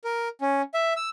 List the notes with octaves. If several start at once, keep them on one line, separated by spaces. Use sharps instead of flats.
A#4
C#4
E5
E6